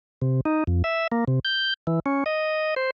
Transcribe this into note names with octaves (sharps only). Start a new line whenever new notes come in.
C3
D#4
F2
E5
A#3
C3
G6
E3
C#4
D#5
C5